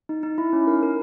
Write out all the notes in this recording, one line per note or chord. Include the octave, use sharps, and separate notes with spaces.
D#4
D#4
E4
C#4
A#4
A#4